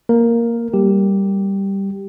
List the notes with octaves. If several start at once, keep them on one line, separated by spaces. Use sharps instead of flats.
A#3 A#4
G3 G4